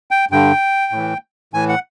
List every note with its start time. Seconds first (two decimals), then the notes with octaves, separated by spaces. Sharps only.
0.11 G5
0.31 G2 D3 G5
0.92 A2 E3
1.54 A2 E3 G#5
1.69 F#5